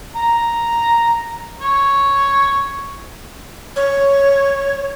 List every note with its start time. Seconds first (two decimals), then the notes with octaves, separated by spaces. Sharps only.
0.16 A#5
1.61 C#5
3.76 C#5